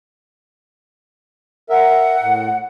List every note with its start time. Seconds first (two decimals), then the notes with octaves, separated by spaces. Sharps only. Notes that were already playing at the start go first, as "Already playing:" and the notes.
1.69 A#4 E5 F#5
2.21 A2